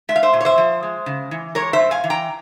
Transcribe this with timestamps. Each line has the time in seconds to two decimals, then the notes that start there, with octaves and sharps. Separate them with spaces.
0.09 G#3 E5
0.16 F5
0.23 C5 E5
0.33 A#2
0.41 C#5
0.45 C5 E5
0.58 F3
0.83 G#3
1.06 C#3
1.31 E3
1.55 G#3 A#4 C#5
1.73 C5 E5
1.79 G2
1.91 F5 G#5
2.04 E3
2.10 G5 A#5